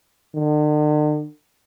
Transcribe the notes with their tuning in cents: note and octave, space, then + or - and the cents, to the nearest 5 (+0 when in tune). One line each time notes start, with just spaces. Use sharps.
D3 +45